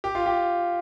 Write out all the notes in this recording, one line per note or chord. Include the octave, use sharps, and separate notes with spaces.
G4
F4
G4